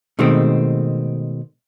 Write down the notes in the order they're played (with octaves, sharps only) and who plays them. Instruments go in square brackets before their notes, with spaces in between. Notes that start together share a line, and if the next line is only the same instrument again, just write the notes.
[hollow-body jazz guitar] B2 D#3 G#3 A3 C4